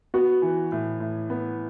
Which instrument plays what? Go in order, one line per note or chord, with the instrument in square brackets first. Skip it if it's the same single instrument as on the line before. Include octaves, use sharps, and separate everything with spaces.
[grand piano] B3 [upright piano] F#4
[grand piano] E3
A2
A2
B3